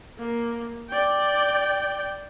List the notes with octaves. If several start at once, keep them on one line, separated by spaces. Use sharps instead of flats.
A#3
D5 G5